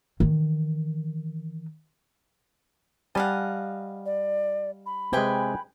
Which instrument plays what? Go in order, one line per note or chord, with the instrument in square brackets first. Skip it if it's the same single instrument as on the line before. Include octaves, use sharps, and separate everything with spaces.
[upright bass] D#3 E3
[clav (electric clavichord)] G3 G#5 A5 [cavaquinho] D#5 F5 F#5
[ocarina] D5
B5
[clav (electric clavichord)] C3 G#3 [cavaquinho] B4 G5 G#5